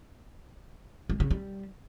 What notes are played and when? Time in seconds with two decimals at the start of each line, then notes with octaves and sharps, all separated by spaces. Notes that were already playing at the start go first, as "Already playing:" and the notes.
1.10 G#3
1.20 C#3
1.31 G3